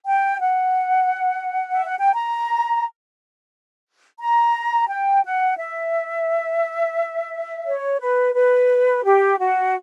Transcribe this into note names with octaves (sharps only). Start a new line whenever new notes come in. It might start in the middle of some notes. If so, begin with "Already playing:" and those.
G5
F#5
E5
F#5
G5
A#5
A#5
G5
F#5
E5
C#5
B4
B4
G4
F#4